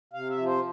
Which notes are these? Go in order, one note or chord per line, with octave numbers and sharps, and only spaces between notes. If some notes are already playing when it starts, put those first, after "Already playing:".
C3 F5
E5
F3
C5